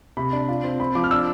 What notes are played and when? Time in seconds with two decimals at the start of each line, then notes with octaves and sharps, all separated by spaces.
0.17 C3 B5
0.33 D4
0.49 F4
0.64 C4
0.80 C4 B5
0.95 F3 D6
1.04 F6
1.11 D4 E6